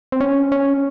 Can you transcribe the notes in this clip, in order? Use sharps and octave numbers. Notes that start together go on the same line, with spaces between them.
C4
C#4
C#4